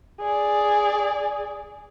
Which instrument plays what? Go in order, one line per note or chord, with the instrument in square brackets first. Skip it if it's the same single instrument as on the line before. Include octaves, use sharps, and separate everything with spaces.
[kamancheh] G#4 D5